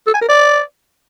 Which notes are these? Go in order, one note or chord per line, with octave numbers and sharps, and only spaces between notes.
A4
G#5
A#4
D5